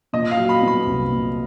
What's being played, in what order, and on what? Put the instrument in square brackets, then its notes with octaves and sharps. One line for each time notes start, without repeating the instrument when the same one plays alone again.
[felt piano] A#2 [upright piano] D#5
[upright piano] F5
[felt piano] F#3
[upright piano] B5
[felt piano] B3
[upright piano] B5
[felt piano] C2
A#2